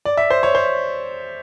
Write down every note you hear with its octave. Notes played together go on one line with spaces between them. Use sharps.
D5
E5
C5
C#5
C5